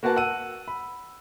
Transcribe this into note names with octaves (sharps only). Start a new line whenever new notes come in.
A#3 F#4 B4 F#5 A5
F#5 E6 D#7
B5